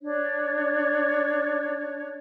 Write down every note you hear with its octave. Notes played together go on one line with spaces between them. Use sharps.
D4 C#5